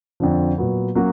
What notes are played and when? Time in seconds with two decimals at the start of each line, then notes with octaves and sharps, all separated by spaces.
0.20 F2 D3 F3
0.58 A#2 F#3 B3
0.95 F#3 A#3 C#4 F#4